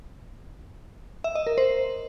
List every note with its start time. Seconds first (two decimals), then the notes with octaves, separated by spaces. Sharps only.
1.24 E5
1.35 D#5
1.47 A#4
1.58 C5